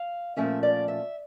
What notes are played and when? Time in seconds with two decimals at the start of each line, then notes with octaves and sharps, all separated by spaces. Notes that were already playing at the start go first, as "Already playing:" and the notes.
Already playing: F5
0.36 A#2 F3 A3 C#4 E5
0.63 D5
0.88 E5